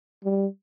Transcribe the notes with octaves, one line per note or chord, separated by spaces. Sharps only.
G3